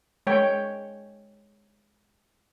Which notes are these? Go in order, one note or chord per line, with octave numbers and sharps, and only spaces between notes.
G#3 C#5 G5